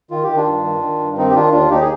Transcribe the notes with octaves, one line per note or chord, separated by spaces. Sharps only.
D#3 F4
G4
D#3
D4 F4
G2
D#3
D#3
G2
D#3 C4 D#4
G4
D#3 D4 F4
D#2 D4 F4
D#2 D#4 G4
G#4